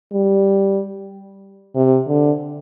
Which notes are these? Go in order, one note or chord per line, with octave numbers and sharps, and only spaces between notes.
G3
C3
D3